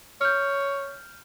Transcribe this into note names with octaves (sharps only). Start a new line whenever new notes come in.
C#5 F6 G6